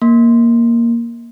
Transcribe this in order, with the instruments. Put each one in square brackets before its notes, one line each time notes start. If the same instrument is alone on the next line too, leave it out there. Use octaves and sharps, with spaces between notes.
[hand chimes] A#3